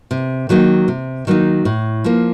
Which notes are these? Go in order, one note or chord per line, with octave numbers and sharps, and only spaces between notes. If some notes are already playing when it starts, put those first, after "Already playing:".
C3
D#3 F#3 A#3 D#4
C3
D#3 F#3 A#3 D#4
A2
F3 A#3